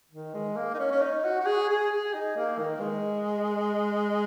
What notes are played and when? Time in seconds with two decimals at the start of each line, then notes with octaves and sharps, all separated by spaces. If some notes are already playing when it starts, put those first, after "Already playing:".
0.11 D#3
0.34 G#3
0.56 A#3
0.74 D#4
0.79 C#4
0.92 C#4
1.01 D#4
1.24 F#4
1.40 F#4
1.45 G#4
1.69 G#4
1.91 G#4
2.14 D#4
2.36 A#3
2.59 D#3
2.80 G#3